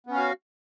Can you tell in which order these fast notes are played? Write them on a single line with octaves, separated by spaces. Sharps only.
B3 C#4 F5 F#4